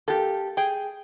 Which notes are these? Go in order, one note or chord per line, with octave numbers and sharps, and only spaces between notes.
A#3 G4 A4
G#4 G5